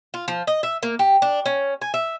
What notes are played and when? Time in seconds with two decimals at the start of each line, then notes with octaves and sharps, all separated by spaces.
0.14 F4
0.28 F3
0.47 D#5
0.63 E5
0.83 A#3
0.99 G4
1.22 D4
1.46 C#4
1.81 G#5
1.94 E5